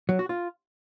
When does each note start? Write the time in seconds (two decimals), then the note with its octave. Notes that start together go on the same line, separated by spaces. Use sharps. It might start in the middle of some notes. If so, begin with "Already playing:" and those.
0.09 F#3
0.19 F#4
0.29 F4